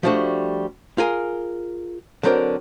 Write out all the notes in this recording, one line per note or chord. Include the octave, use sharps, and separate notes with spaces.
F3 G3 A3 D4 F#4
F4 G#4 A#4 G#5
D3 F#3 C4 A#4 D5